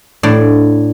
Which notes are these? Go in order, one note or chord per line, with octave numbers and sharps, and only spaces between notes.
A2 D4